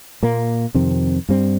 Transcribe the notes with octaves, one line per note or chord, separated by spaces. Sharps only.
A#2 A#3
F2 C3 D#3 C4
G2 G3 C4